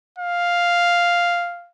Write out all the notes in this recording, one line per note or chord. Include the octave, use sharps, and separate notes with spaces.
F5